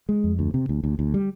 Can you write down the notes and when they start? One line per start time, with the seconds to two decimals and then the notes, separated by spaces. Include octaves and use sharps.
0.09 G#3
0.24 F2
0.39 D2
0.54 C3
0.69 D2
0.84 D2
0.99 D2
1.14 G3